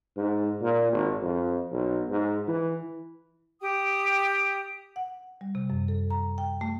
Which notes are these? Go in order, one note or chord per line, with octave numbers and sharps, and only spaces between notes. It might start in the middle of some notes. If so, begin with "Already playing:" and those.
G#2
A#2
G#1
F2
B1
G#2
E3
G4 G5 D#6
F#5
G3
C3
F#2
A4
A#5
G5
A3